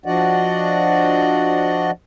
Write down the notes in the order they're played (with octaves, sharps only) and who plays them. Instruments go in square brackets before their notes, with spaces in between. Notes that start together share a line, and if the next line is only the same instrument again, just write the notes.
[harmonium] F3 D4 F#4 D5 D#5 F#5